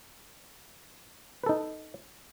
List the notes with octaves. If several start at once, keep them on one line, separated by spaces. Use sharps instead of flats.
D#4 A4 B4